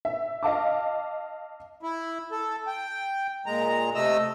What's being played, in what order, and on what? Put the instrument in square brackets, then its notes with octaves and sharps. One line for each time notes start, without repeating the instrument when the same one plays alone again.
[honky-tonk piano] E5
D#5 F5 A5 D6
[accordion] E4
A4
G5
A#2 G#3 A#5
C3 A3 D#5 E6